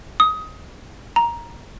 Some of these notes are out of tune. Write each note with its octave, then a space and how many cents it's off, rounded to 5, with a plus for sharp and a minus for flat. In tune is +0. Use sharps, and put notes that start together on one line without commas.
D#6 +20
A#5 +10